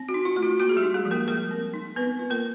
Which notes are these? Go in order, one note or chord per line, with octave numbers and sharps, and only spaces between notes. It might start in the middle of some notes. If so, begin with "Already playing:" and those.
Already playing: C4
F#4
D#4
F4
A3 F4
F#4
A#3 F#4
G#4
G3 G4
D#4
G#3 G#4
F3
A#3 A#4
G3 A#3 A#4
C4
D#4
B3 C4 B4
F4
A#3 A#4